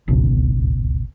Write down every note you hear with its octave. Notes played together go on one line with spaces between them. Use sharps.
D1 G#1 C#2 B2